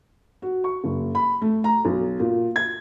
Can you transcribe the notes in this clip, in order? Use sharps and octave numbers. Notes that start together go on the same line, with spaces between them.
F#4
C#6
F#1
B5
A3
A#5
B1
A#2
G#6